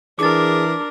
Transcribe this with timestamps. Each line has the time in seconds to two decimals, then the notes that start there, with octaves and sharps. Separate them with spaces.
0.19 E3 D4 G#4 A#4 D6 A6